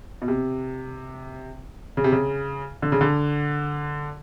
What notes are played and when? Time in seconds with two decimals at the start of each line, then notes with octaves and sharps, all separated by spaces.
0.22 B2
0.28 C3
1.97 C#3
2.04 C3
2.12 C#3
2.82 D3
2.92 C#3
3.01 D3